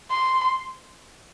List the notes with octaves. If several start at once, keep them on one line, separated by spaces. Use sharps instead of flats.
C6